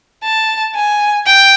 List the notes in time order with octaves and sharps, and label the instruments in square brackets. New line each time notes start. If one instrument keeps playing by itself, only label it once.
[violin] A5
G#5
G5